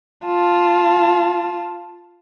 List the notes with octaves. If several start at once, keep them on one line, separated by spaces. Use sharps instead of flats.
F4 A5